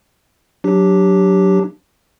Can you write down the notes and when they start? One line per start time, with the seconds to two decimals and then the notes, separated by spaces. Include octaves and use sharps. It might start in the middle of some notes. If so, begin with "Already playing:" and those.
0.64 F#3 D4 G4